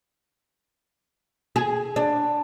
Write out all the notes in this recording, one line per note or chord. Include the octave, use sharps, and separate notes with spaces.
G#4
D4